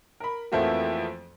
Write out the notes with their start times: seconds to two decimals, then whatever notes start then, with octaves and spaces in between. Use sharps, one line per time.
0.20 A#4 B5
0.52 F2 E3 F3 A3 A#3 F#4